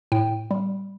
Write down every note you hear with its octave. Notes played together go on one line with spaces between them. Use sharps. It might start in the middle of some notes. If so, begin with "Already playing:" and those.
A2 G5
G3